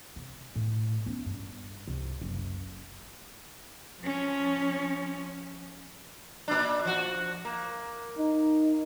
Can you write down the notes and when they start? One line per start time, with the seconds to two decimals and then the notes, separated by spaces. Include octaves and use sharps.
0.16 C3
0.55 A2
1.06 B3 C#4
1.26 G2
1.88 C2
2.21 F#1 C#3
4.00 F3 C#4
6.48 A#2 D4
6.85 F3 F#4
7.45 A#3
8.18 D#4